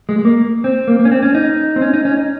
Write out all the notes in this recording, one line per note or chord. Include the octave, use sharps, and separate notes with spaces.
G#3
G#3
A#3
C4
A#3
A#3
C#4
C4
C#4
D#4
C4
C#4
D#4
C#4
D#4